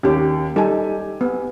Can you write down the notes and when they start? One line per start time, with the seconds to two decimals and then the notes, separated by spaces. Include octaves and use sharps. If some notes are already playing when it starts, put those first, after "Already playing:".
0.03 D#2 C#4 G4
0.56 G3 D#4 G4 A4 G#5
1.21 B3